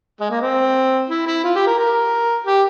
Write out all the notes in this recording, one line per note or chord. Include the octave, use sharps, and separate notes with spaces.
G#3
A#3
C4
E4
E4
F4
G4
A#4
A#4
G4